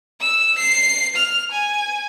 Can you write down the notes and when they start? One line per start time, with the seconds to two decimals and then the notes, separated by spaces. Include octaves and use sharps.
0.20 E6
0.58 C7
1.16 F6
1.51 G#5